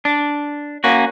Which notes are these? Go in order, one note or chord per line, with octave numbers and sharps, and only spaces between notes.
D4
A#3 C#4 F#4